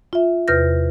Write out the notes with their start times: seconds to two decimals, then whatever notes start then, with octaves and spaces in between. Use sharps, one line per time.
0.13 F4 E5
0.48 E2 C3 B4 F6 G6 A#6